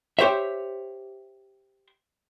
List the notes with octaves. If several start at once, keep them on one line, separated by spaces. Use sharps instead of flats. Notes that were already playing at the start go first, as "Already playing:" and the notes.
G4 C5 C#5 E5